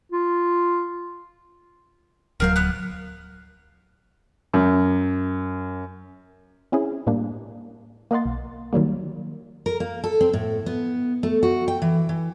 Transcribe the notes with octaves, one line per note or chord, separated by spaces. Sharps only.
F4
D1 F#3 A#4 C5 F5
B3 F#6
F#2
C4 C#4 E4 G#4
A2 G3 A#3 D4
A#3 A#4 D#5 F#5 C6 A6
B1
D#3 F#3 G3 A#3
A#4
A#3
A4
C4
A2
B3
A3
F#4
G5
E3
E3